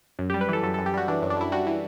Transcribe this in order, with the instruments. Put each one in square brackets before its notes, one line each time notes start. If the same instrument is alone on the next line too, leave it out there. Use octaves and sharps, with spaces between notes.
[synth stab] F#2
G3 G4
B4
E3 A4
F#2 A4
F#2 A4
G4
G3 F#4
E3 D4
F#2
D4
F#2 E4
G3 F#4
E3